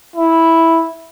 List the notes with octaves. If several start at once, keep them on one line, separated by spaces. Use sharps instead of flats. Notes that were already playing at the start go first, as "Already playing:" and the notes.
E4